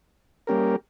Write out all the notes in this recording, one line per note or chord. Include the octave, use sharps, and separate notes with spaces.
G3 A#3 C#4 G4 A#4